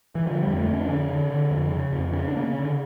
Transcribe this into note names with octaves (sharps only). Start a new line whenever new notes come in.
E3
D3 F3
F2 G3
A3
F2
C#4
D4
D3 C#4
D3
D3
F2
C#3
F2
C#3 C#4
D4
C#3 A#3
C#4
C#3
D3